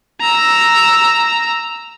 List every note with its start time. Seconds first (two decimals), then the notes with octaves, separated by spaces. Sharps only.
0.21 A#5 E6